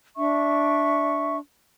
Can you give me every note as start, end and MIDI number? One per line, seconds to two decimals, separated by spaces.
0.16 1.37 62
0.16 1.37 76
0.16 1.37 85